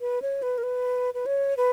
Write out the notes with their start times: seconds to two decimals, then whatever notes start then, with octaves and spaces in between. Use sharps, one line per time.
0.01 B4
0.22 C#5
0.42 B4
0.58 A#4
0.63 B4
1.14 B4
1.26 C#5
1.57 B4